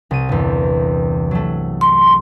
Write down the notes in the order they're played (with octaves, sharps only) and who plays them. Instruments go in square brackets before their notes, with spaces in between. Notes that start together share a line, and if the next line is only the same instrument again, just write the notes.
[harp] C2 D#7
G1 E2
F#3 A3
[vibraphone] C6